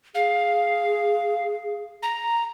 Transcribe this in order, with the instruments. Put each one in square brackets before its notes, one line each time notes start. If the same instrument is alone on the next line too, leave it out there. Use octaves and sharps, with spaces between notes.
[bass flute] G#4 [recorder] F5
[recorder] A#5